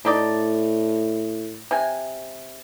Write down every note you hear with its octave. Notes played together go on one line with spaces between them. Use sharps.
A2 D4 D#4 D5
C3 G#5